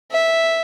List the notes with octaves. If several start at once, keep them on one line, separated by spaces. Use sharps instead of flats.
E5